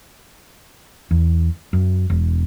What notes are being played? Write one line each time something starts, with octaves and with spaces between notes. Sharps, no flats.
E2
F#2
E1